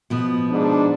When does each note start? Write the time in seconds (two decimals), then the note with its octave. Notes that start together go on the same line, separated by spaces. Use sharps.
0.10 B2 F3 B3
0.50 G#2 D4